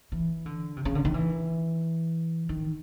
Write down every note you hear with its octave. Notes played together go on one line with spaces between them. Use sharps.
E3
D3
C3
C#3
D3
D#3
E3
D#3